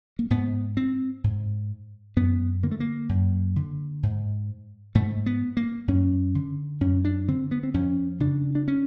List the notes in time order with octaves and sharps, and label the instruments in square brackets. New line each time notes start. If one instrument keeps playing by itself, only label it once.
[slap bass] A#3
G#2 B3
C4
G#2
F#2 B3
D3 A#3
A3
A#3
F#2
D3
G#2
G#2 A3
B3
A#3
F#2 C#4
D3
F#2 C#4
D4
D3 C4
B3
C4
F2 C#4
C#3 D4
D4
C#4